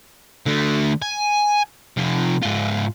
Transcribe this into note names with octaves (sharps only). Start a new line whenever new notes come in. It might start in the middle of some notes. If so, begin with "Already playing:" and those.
D3 A3
G#5
C3 F3
G#2 F4